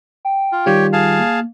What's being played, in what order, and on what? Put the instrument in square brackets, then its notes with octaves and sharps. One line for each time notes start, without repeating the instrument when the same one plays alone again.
[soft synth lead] G5
[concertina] F4
[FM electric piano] D#3 G3 F4 [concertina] G4 C#5
[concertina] G#4 F5 A5
[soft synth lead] A#3